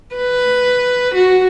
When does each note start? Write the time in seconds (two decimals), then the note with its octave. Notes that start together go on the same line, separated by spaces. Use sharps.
0.15 B4
1.15 F#4